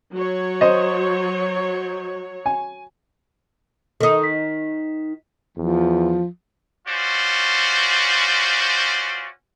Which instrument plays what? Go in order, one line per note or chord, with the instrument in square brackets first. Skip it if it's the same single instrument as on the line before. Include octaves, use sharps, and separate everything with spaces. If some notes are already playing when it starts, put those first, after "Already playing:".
[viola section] F#3 C#5
[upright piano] C5 D#5
G#5
[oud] D#3 D#4 [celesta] A4 D#6
[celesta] B6
[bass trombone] E2 [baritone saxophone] F3
[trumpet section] C#4 F4 F#4 C5 D5